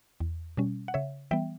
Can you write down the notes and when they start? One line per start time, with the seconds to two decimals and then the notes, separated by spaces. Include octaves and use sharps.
0.20 E2
0.57 B2 G3 C#4
0.88 F#5
0.94 C#3 C#5 E5
1.31 E3 G3 B3 E5 G5